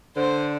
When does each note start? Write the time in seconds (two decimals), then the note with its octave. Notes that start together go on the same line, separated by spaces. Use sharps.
0.17 D3 C5